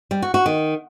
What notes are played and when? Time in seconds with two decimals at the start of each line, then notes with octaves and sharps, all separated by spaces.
0.11 G3
0.22 F#4
0.34 F#4
0.46 D#3